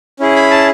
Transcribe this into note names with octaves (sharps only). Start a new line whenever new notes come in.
C#4 E4 G#4
B5
A5